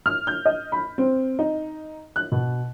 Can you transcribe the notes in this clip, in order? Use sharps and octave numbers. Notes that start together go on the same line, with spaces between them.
F6
G6
D#5
B5
C4
D#4
F#6
B2